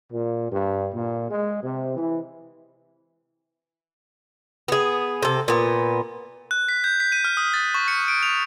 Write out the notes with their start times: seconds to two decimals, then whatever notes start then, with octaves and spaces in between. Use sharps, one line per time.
0.12 A#2
0.51 G2
0.94 A#2
1.30 G#3
1.63 C3
1.96 E3
4.68 B3 G#4
5.23 C3 A4
5.48 A#2 B3
6.51 F#6
6.69 B6
6.84 G6
7.00 B6
7.12 D#7
7.24 F6
7.37 D#6
7.54 A6
7.74 C#6
7.88 C#7
8.08 D7
8.23 F7